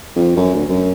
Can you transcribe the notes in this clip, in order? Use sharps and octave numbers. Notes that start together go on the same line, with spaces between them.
F2
F#2
D2
F#2